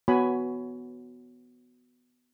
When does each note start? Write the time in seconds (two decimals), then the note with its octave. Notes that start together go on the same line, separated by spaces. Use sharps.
0.08 B3 F#4 C#5 G#5 B5